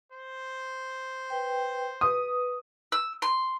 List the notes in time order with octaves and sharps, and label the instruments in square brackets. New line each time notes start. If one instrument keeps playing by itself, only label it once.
[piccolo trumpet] C5
[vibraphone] B4 G5
[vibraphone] B4 [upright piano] D#6
[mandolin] E6
C6